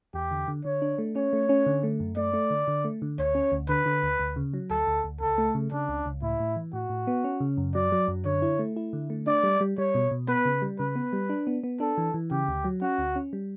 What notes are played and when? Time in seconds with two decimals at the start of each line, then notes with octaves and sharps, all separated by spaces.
0.14 E2 G4
0.31 D3
0.48 D3
0.65 D3 C#5
0.82 D4
0.98 A3
1.15 C#4 C#5
1.33 A3
1.49 C#4
1.66 D3
1.83 A3
2.00 F#2
2.17 A3 D5
2.33 A3
2.50 D3
2.68 D3
2.85 A3
3.02 D3
3.18 D2 C#5
3.35 C#4
3.52 D2
3.69 D3 B4
3.86 D3
4.03 D2
4.20 D2
4.36 C#3
4.54 F#3
4.70 D2 A4
4.87 D2
5.04 D2
5.21 C#2 A4
5.38 A3
5.55 C#3
5.72 C#3 D4
5.89 C#2
6.06 C#2
6.22 A2 E4
6.40 A2
6.56 E3
6.73 A2 F#4
6.90 A2
7.07 B3
7.24 C#4
7.40 C#3
7.57 F#2
7.74 F#3 D5
7.92 F#3
8.08 F#2
8.25 D3 C#5
8.42 E4
8.59 A3
8.76 E4
8.93 D3
9.10 A3
9.27 D4 D5
9.43 G3
9.61 G3
9.78 G3 C#5
9.95 B2
10.11 B2
10.28 B3 B4
10.45 C#3
10.62 G3
10.79 C#3 B4
10.96 B3
11.13 G3
11.29 D4
11.47 B3
11.64 B3
11.80 D4 A4
11.98 E3
12.14 E3
12.31 C#3 G4
12.48 D2
12.64 F#3
12.82 C#4 F#4
12.98 D2
13.16 C#4
13.33 G3